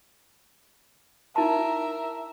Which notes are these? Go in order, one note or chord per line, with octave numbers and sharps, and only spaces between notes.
D#4 E4 A#4 E5 A5